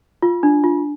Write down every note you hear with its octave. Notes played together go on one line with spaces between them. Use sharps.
F4
D4
F4